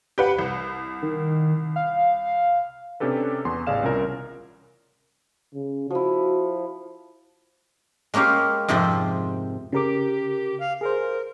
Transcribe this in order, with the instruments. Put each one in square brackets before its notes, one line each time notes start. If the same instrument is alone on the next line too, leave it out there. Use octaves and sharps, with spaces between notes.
[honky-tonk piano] G4 B4 F#5
C2
[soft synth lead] D#3
F5
[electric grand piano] C3 C#4 D4 G4 A4 B4
E2 B3 C6
A1 C#3 G#4 D5 F5 E7
C2 C#4 F4 A#4
[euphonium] C#3
[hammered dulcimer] F3 E4 [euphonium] F#4
[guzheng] G#3 A#3 C#4 G4 F5
F2 G#2 C3 F3 C4 C5
[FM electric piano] C#3 A#4 D6 [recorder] G4
[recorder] F5
[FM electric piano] G#4 C5 [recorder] A#4